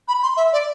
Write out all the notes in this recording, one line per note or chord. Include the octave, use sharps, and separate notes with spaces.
B5
C6
E5
D5